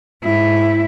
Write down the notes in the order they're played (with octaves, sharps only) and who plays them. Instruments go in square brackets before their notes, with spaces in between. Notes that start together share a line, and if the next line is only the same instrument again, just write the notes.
[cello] G#2 E4